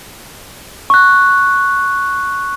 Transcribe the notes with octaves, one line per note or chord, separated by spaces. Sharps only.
C#6 F#6